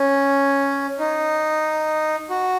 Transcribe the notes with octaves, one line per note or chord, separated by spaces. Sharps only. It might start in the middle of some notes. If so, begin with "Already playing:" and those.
Already playing: C#4
D#4
F#4